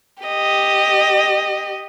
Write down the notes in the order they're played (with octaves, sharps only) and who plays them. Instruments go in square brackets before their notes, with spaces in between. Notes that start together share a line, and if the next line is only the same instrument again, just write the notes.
[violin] G4 D#5